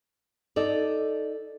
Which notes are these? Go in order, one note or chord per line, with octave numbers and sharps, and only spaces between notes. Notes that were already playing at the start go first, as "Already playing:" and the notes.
D#4 A4 D5